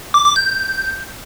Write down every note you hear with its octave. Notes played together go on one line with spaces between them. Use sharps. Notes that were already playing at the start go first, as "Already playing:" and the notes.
D6
D6
G6